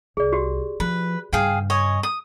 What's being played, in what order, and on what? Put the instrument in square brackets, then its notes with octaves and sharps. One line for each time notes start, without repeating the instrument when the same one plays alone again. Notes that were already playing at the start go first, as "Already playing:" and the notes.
[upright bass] C2 [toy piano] G#4 D5
[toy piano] F#4 G4
[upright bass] F3 [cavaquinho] B4
[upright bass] G2 C#3 [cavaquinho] G#4 F5 G5
[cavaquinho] C#5 D#5 G#5
D#6